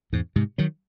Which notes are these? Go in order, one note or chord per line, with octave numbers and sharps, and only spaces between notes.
E2 G#2
G#2 C3
D#3 F#3